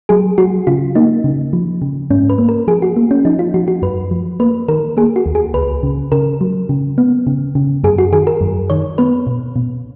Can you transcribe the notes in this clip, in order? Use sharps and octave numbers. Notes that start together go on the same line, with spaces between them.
F#3 G#4
F#3 F#4
C#3 F4
A#3 D#4
C#3
F3
C#3
G#2 C#4
B4
A#3
A#4
F3 G#4
F#4
A#3
C#4
F3 D#4
F4
F3 F#4
F#4
F#2 B4
F3
A#3 B4
D#3 A#4
A#3 G#4
F#4
D#2
G#4
C#2 B4
C#3
C#3 A#4
F#3
C#3
B3
C#3
C#3
F#2 G#4
F#4
D#3 G#4
A#4
F#2
D#3 C#5
B3 B4
B2
B2